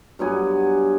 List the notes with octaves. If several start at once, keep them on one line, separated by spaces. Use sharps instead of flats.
G2 F#3 B3 G#5